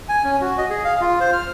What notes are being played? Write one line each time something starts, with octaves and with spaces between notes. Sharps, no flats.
G#5
C#4
F#4
D#5
G#4
F5
F4
C5
F6